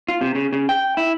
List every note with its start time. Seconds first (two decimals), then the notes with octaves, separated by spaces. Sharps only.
0.08 F4
0.21 C3
0.35 C#3
0.53 C#3
0.69 G5
0.97 E4